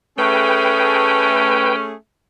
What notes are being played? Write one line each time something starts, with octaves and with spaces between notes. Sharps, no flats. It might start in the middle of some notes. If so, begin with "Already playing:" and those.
A3 C#4 G#4 B4 G5